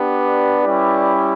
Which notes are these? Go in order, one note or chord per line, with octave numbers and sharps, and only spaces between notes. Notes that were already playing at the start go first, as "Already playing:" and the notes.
Already playing: B3 D4 G4
B4 D5
G3 C#4 E4 G4